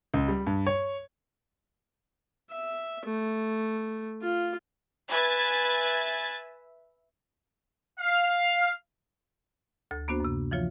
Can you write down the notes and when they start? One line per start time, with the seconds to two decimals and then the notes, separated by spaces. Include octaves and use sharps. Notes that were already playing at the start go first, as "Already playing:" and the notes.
0.14 C#2
0.28 G3
0.47 G2
0.67 C#5
2.51 E5
3.05 A3
4.22 F4
5.09 B4 E5 G#5 G#6 A6
7.99 F5
9.91 D2 A4
10.08 A#3 B3 D4 F#4 C5
10.20 F#2 C3
10.51 E3 F3 F4 C#5